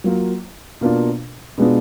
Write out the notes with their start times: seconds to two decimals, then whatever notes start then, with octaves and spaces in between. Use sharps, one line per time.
0.04 F#3 A#3 F4
0.81 B2 A#3 D4 F4
1.58 B2 G#3 B3 D4 F4